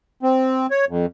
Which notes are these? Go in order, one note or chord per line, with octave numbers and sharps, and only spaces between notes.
C4
C#5
F2